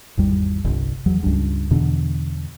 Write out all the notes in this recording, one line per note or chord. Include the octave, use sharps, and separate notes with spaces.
G#1 E2 G3
G1 C2
E2 F#3
C#2 G2
E2 B2 D3